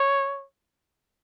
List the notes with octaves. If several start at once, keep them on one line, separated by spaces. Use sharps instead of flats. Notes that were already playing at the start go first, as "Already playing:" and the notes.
Already playing: C#5